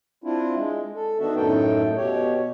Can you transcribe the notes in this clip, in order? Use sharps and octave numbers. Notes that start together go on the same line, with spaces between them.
C4 D4 E4 F4
G#3
A4
D#3 B3 D4 F#4 E5
F#2 A2 A3 D#4 A4 G5
B2 G4 C#5